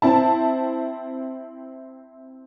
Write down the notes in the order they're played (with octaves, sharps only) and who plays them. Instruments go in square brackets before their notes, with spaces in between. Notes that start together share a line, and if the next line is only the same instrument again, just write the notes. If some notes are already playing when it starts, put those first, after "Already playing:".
[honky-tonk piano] C4 E4 A5